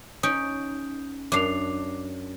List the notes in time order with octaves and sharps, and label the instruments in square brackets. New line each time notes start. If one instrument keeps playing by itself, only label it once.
[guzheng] C#4 D#4 [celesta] D#6 G6 D7
[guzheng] F#2 D4 [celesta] D6 C7 F7